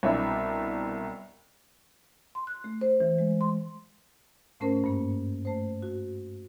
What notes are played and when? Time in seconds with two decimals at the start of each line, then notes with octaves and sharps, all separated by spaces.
0.03 C2 B2 D4 E5 B5 D6
2.35 C6
2.47 F#6
2.64 A3
2.81 C5
3.00 E3
3.19 G#3
3.41 C6
4.60 G#2 A3 C#4 A#4 C5
4.84 G2 A#3
5.45 A3 C5
5.82 F#4